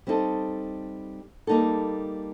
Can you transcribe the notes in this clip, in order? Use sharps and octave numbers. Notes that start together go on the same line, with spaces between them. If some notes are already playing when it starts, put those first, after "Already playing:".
G3 C4 D#4 A4
G3 A#3 D#4 A4